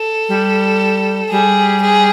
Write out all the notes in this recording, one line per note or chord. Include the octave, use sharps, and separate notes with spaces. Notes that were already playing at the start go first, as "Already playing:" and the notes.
Already playing: A4
G3
G3 G#4
G#4